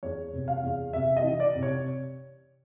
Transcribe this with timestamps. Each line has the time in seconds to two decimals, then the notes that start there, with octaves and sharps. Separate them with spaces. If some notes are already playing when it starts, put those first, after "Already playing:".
0.03 E2 C#5
0.33 C3
0.48 F5
0.63 E2
0.93 C3 E5
1.17 D#5
1.24 E3
1.40 D5
1.55 C3
1.63 C#5